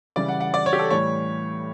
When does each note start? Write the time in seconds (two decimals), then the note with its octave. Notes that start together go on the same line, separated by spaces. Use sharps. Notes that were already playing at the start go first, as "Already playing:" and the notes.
0.16 C#3 E3 G3 D5
0.28 F#5
0.40 F#5
0.54 D5
0.66 C#5
0.73 G4
0.79 A4
0.90 A2 E3 G3 C#5